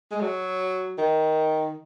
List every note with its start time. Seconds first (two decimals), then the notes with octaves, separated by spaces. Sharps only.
0.11 G#3
0.21 F#3
0.98 D#3